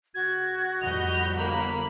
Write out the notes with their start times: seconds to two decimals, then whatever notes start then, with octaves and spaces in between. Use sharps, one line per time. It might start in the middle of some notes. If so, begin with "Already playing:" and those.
0.14 C#2 F#4 G#6
0.81 F2 A2 G3 D#5 B5 G6 F7
1.36 G1 D3 A#3 B5